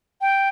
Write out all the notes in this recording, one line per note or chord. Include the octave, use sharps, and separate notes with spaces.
G5